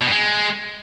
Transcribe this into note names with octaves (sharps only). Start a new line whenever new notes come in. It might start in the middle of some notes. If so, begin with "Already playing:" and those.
B2
G2
G#3